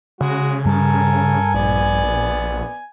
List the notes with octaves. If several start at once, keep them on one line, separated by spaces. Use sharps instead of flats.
C#3 G#3 F#4
G2 G3 A4 A#4 G#5 A5
A#1 B3 D5